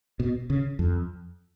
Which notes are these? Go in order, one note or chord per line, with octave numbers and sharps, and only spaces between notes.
B2
C#3
F2